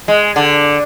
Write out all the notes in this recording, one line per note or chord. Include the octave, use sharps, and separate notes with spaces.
G#3
D3